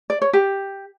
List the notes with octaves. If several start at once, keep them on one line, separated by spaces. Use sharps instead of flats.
D5
C#5
G4